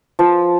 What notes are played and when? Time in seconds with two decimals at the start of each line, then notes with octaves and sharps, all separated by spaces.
0.19 F3